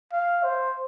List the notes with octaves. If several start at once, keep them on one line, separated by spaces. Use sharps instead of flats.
F5
C5